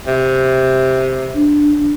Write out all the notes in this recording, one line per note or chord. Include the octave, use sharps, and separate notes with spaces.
C3
D4